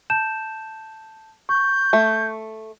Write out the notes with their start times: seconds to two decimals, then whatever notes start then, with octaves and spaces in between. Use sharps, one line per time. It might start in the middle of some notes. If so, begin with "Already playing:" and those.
0.10 A5 G6 E7
1.49 C#6 G6
1.93 A3